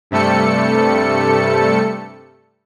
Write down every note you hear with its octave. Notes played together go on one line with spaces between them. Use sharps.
G2 C3 G3 A3 A4 C#7